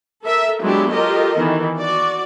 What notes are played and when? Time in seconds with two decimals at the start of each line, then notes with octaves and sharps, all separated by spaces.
0.23 A4 A#4 E5
0.61 F#3 G#3 B3 D4 E4 G4
0.92 F4 G4 A4 A#4 D#5
1.37 D#3 E3 B3
1.79 F#4 D5